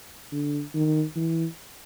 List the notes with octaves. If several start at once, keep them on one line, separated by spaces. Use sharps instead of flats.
D3
D#3
E3